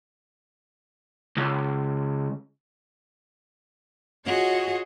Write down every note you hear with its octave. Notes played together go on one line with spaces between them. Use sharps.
C#2
F4 F#4 G#4 C#5 D#5 F#5